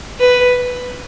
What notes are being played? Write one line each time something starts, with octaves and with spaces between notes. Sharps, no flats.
B4